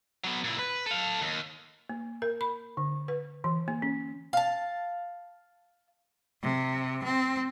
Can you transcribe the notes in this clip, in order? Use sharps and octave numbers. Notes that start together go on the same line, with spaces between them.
F#3 B3
A#2 E4
B4
A4 F5
D#2
A#3
A#4
B5
D3
B4
E3
A#3
C#4
F5 A5
C3
C4